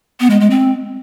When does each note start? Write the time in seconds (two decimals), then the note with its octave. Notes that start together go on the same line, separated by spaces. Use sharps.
0.20 B3
0.30 G#3
0.40 G#3
0.50 C4